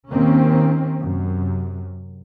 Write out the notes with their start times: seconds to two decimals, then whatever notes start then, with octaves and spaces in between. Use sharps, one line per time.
0.11 D#2 D#3 A#3 C4 C#4
1.02 F#2 C3